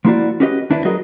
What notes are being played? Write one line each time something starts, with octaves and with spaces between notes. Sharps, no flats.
F3 A#3 E4 F#4 D5
C#4 F#4 G4 B4 D#5
D#2 D4 E4 B4 D5
F#3 F#4 G#4 A#4 B4 D#5